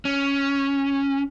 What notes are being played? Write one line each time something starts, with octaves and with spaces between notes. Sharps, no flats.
C#4